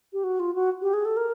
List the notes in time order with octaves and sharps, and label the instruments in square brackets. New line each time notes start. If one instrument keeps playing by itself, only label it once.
[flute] G4
F#4
F4
F#4
G4
G#4
A4
A#4